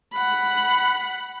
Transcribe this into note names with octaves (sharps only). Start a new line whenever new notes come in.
F#5 B5